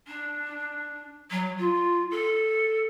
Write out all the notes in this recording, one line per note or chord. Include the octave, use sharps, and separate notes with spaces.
D4
F#3
F4
A4